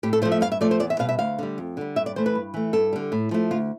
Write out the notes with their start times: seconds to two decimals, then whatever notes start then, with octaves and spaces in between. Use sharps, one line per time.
0.03 A2 G4
0.13 A4
0.22 A3 C5
0.25 F3
0.32 E5
0.41 G2 F5
0.52 E5
0.61 F3 A3 D5
0.71 C5
0.80 E2 D5
0.90 E5
0.99 B2 G3 F5
1.09 E5
1.19 D2 F5
1.39 D3 G3
1.58 F2
1.77 D3 G3
1.96 G2 E5
2.06 D5
2.16 E3 A3 C5
2.26 B4
2.35 G2
2.54 E3 A3
2.73 G2 A4
2.93 D3 G3
3.12 A2
3.31 F3 A3
3.51 D2 F4